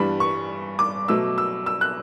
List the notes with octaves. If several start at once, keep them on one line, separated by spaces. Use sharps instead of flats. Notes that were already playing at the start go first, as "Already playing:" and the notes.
Already playing: G2 E3 G3 B3 D4 B5
C#6
D6
B2 F#3 A3 E6
E6
E6
F#6